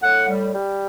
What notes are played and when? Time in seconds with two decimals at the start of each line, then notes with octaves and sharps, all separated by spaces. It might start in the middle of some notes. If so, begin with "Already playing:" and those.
0.03 A2 F#5
0.29 G3
0.54 G3